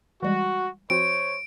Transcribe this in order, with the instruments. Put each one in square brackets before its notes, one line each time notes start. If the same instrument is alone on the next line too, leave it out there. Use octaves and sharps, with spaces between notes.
[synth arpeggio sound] E3 G3 G#3 [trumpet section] F#4
[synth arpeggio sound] F3 C4 F#4 [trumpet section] C5 C#5 [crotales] D7